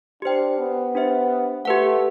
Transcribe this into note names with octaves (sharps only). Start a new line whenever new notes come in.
D4 G4 C5 G5
B3
D4 G4 C5 E5
A3 G4 B4 F#5